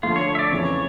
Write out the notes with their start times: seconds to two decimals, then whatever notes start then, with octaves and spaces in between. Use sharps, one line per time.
0.03 D3 F3 A3 F4
0.16 C#5
0.35 E5
0.39 D5
0.51 F2 C#3 E3 C#5